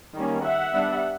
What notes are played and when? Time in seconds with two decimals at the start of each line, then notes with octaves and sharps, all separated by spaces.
0.15 D#3 G3 A#3 C#4
0.43 E5 F#5
0.73 G3 B3 D4